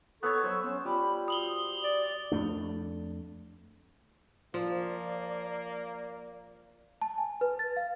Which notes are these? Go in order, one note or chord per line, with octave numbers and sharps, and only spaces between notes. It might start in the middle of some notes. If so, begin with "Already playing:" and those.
B3 A4 C#5 C#6
F#3 C5 E6
B3 C#4
G3 F4 B5
F#4 D#6 F#7 G7
D5
F2 A3 D4
F3 A#3 D5
A5
G#5
B4
A6
F5